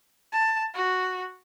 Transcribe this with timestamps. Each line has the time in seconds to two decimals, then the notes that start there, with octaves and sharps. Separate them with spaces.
0.33 A5
0.74 F#4